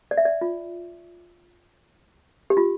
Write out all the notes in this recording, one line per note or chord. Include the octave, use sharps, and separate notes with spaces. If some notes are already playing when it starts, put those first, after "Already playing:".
D5
E5
D5
F4
G4
F4